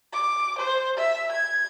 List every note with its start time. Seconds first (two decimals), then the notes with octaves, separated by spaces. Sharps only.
0.13 D6
0.59 C5
0.97 E5
1.32 G#6